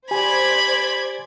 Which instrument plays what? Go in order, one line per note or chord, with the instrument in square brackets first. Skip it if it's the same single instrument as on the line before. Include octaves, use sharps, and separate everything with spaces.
[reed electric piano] G4 G#5 [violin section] C5 D5 G#6 [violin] B5